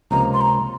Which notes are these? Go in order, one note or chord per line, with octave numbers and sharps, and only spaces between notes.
C#2 C3 F3 A#3 A#5
C6
A#5